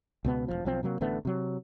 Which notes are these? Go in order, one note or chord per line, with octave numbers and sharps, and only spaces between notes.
C#2 B2 B3
E1 C#2 F3
B1 F3 C4
C3 F#3 G#3 A#3
A1 D3 A3 B3
C3 F#3